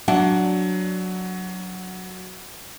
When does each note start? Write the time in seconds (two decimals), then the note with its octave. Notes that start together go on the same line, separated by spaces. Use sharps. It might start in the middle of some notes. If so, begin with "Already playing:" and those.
0.08 F#3 D4 F#5